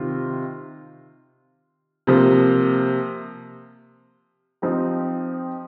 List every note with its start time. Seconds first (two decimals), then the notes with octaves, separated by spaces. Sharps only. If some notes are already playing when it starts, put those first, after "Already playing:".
Already playing: C3 D#3 C4 F4
2.07 C3 F3 A#3
4.62 F3 C4 D#4 G4